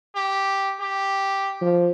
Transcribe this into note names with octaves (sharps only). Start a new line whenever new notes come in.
G4
G4
F3